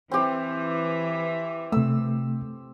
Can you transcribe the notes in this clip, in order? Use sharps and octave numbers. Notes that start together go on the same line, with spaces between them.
E3 C4 G4
C3 A3 E6